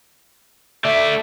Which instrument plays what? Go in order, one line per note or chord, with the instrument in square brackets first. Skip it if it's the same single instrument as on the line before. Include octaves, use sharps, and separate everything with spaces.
[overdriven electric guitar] A3 D5 [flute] E5